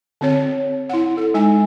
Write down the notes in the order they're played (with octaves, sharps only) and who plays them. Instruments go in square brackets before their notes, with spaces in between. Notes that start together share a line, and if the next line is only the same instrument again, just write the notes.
[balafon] D3 C4 C#5
E4 F#5
A4
G#3 D#4 G#5